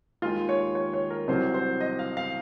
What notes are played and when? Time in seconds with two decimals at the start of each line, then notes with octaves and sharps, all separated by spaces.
0.22 D#2 D#3 G#3 F4
0.49 C#5
0.75 C#5
0.94 C#5
1.10 A#4
1.28 C2 C3 F#3 C5
1.54 C5
1.81 D#5
1.99 F5
2.17 F5